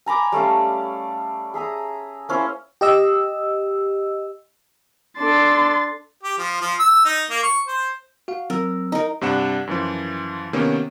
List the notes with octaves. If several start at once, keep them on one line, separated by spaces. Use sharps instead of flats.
G#5 A#5 B5 D6
G3 A3 C#4 F5
G#4 E5 A#5 D#6
A#3 C#4 E4 C5
G4 D#5 E6
D4 A4 C6 A6
G4
F3
F3
E6
D#4
A#3
C#6
C5
F#4 F5
F#3 C4 A#4 E6
D#4 A#4
G2 C3 D4 F#5 E7
F#2 E3 F3
C3 D#3 A#3 B3 C#4